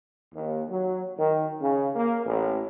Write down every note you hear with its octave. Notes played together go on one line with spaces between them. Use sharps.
D#2
F#3
D#3
C#3
A#3
A1